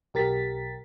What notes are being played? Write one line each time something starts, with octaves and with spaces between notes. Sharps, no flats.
B1 G4 A#4 A6 B6